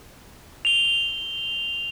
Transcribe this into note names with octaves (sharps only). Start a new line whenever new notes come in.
F7 G7